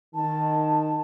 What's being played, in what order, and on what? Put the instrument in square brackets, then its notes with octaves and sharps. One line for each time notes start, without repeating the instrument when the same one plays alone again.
[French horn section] D#3 [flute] A5